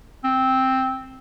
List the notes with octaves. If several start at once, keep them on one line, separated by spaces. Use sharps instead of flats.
C4